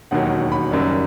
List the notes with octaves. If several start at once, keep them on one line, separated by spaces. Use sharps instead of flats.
E1 D#2 D#3 F#3 F#5
B5
F#1 F#2 D#3 G3